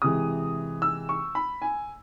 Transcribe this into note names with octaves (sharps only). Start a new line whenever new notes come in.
C3 E3 G#3 D#6
E6
C#6
B5
G#5